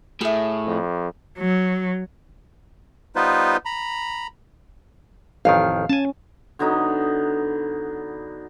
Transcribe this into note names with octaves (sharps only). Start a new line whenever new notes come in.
A2 G#4 E5
F2
F#3
G3 B3 D#4 F4 B4 C5
A#5 B5
A1 F2 D#3 F5
C#4 G#5 A5
D3 F#3 B3 D#4